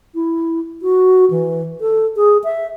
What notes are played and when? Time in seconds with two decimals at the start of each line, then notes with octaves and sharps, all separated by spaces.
0.15 E4
0.82 F#4
1.31 E3
1.81 A4
2.16 G#4
2.44 E5